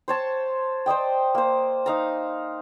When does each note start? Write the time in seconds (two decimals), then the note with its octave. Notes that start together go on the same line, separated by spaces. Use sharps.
0.08 C5 C#5 A5
0.86 C5 D5 D#5 G5
1.35 A#3 C5
1.86 D#4 F5 A#5